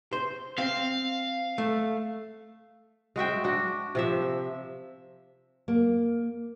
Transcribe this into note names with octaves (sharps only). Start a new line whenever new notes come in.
C5
C4 F5
A3
G#3 F#4 E5 G5
D4 F#4
C3 F3 E5
A#3